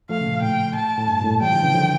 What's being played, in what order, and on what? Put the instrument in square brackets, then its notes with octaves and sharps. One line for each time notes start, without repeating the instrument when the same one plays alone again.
[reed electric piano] F3 A3 [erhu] F5
[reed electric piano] C#3
A#2
[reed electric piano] A2 [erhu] G5
[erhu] A5
[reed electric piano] A2
G2
A#2
A2
[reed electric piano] E3 G3 [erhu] G5
[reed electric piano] D3 F3
C#3 E3
D3 F3